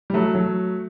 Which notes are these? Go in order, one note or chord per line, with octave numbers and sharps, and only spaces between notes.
G3
F#3 A3
F#3 A3